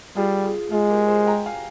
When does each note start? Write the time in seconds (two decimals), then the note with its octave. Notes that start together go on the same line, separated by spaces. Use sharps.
0.16 G3 F4 G#4
0.43 F4 G#4
0.71 G#3 F4 G#4
0.89 G4 A#4
1.08 G#4 C5
1.27 G5 A#5
1.46 F5 G#5